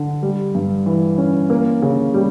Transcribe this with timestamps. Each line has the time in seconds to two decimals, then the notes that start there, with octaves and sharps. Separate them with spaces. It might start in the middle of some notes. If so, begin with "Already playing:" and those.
Already playing: D3
0.23 G3
0.55 G2
0.86 E3
1.18 C#4
1.50 A#3
1.82 C#3
2.14 G3